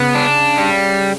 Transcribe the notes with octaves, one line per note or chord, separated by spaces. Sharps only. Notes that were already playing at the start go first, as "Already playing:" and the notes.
Already playing: C#3 B3
D4
G3